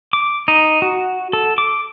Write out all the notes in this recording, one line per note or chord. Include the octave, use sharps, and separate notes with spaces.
D6
D#4
F#4
A4
D6